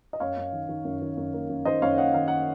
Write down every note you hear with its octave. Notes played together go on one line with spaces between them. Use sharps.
D#5
F#2 C#5 F5
F#2
D#3
D#3
F#2
D#3
F#2
A#3
F#2
D#3 C5 D#5
F#2 C#5 F5
A#3 D#5 F#5
D#3 F5
F#5